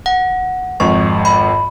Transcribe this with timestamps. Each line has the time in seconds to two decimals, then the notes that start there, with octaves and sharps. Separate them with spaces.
0.06 F#5
0.80 G#1 F2 C#6
1.25 B5